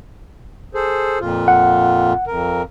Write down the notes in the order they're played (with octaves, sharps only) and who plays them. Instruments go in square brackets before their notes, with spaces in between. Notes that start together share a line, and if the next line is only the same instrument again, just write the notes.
[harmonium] G#4 A4 C5
F2 A#2 F4
[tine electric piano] F#5
[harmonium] F2 A#4